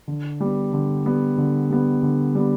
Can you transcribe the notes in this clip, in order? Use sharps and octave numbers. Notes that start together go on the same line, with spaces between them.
D3
G3 B3
D3
G3 B3
D3
G3 B3
D3
G3 B3